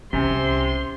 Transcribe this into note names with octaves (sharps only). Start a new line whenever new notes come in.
C2 C3 C#4 C5 G#5 C6